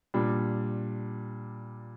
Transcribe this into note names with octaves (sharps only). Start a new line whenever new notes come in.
A#2 G3 D4